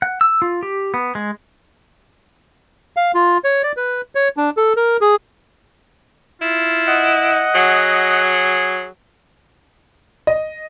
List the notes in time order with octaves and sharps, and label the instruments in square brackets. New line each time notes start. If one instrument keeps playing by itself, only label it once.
[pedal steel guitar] F#5
E6
F4
G4
B3
G#3
[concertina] F5
F4
C#5
D5
B4
C#5
D4
A4
A#4
G#4
[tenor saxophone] E4 [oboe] F4
[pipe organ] D#5 F#5
[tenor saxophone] F#3 [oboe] G#4
[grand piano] D#5